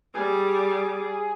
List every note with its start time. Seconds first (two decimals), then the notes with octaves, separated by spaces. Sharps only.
0.15 G3 G#4 D6